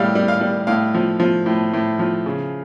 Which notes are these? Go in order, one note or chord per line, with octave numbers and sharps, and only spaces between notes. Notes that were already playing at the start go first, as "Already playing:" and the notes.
Already playing: A2 G3 F5 G5
G3
F5
G3
A2 F5
F3
F3
A2
A2
F3
C#3